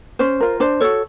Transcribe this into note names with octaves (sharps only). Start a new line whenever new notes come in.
C#4 C5
F4 A#4
D4 C5
F#4 A4 C#5